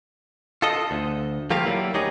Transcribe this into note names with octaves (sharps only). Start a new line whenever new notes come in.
F4 A4 D#5
D2
F3 A3 A#3 F4 G4 F5
F#3 G3 A#3 E4
D2 D#4 G4 G#4 C#5 D#5